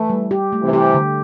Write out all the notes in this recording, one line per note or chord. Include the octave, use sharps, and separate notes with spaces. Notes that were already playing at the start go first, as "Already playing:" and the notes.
Already playing: E3 A3
G3
G4
A3
C3 E3
G4
D3